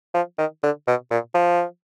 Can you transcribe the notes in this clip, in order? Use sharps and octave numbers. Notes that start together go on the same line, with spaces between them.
F3
D#3
D3
B2
A#2
F3